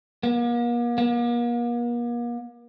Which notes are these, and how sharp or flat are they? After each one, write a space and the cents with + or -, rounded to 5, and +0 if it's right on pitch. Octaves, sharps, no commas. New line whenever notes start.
A#3 +40
A#3 +40